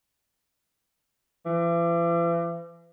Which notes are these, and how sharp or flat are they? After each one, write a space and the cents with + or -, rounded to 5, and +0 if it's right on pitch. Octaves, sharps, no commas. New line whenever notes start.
E3 +45